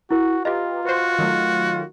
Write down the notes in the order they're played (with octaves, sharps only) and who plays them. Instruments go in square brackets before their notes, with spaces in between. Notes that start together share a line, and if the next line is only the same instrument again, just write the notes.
[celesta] E4 A#4 [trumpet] F#4
[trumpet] F4 [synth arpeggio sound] G4 B4 A#5 [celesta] D#5
[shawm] F#4 [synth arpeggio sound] B4 C5
[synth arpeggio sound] D#3 F#3 A3